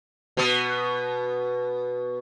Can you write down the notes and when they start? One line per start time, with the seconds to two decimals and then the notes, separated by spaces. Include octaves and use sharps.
0.37 B2 B3